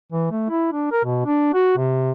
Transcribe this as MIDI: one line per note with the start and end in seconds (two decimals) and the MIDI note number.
0.12 0.27 52
0.32 0.47 57
0.50 0.70 64
0.73 0.91 62
0.92 1.03 70
1.05 1.24 47
1.26 1.50 62
1.54 1.74 66
1.77 2.12 48